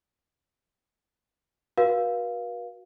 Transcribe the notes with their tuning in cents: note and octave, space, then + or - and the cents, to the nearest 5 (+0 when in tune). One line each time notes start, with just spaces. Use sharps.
F#4 +0 B4 -45 F5 +0